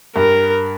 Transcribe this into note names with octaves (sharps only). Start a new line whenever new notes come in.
G2 A#4